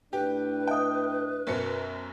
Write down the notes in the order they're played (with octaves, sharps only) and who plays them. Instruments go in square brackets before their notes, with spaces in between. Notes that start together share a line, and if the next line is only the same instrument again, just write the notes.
[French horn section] A2 D4 [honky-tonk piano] G4 [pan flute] B4
[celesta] D#5 E5 D#6 [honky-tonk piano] G5
[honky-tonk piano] B1 F#2 C#7 [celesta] A#4 C5